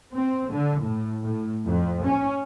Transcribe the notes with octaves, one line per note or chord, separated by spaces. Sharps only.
C4
D3
A2
A2
F2
C#4